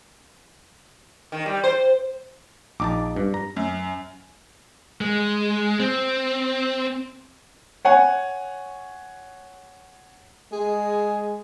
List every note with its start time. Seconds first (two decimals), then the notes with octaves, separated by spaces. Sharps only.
1.32 D#3
1.46 G3
1.64 C5
2.80 A#1 D#4 A5 D6
3.16 G2
3.34 A#5
3.56 F#2
5.01 G#3
5.79 C4
7.85 C#5 F#5 G#5
10.52 G#3 G#4